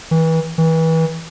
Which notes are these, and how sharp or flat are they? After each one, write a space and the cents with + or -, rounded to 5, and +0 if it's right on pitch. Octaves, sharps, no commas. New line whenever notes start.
E3 -30
E3 -30